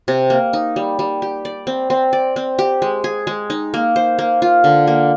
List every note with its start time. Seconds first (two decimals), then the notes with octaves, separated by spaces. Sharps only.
0.08 C3
0.30 A#3
0.53 D#4
0.76 G3
0.99 G3
1.22 G4
1.45 D5
1.67 C4
1.90 C4
2.13 D5
2.36 C4
2.59 G4
2.82 G#3
3.04 G#4
3.27 G#3
3.50 D#4
3.74 A#3
3.96 C5
4.19 A#3
4.42 F4
4.64 D3
4.87 A#3